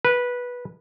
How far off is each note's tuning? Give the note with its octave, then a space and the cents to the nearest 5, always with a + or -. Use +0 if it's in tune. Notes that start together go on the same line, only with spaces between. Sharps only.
B4 -15